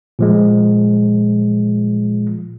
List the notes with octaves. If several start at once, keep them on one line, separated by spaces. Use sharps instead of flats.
A#2 F3 G#3